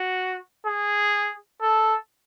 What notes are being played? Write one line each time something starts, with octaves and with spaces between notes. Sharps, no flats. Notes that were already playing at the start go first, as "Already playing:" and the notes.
Already playing: F#4
G#4
A4